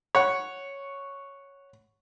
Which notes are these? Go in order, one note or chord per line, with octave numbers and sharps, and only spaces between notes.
C#5 F#5